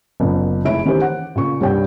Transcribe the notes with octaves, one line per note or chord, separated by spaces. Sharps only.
F#1 A#2 B3
F1 G#3 E4 C#5 D7
D#3 E3 C#4 G4 C5
F#5
A#2 C#3 C#6
C2 G2 C#5 D5 G5